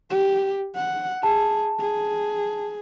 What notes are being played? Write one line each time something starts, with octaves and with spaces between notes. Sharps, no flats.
G4
F#5
G#4 A5
G#4